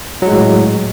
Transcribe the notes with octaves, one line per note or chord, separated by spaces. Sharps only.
A2 F#3 G#3